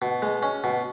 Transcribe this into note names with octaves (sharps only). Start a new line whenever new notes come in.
B2
G#3
C#4
B2